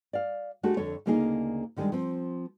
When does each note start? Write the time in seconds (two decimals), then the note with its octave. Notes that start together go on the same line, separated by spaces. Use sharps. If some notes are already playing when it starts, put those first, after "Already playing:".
0.13 D5 F5
0.63 G#3 A3 D4 F#4 G4 A4
0.77 F2 D3 D4 A4 C#5
1.06 D2 C#3 A#3 D4 D#4 G#4
1.77 D3 D#3 G3 G#3 D4
1.92 F3 C4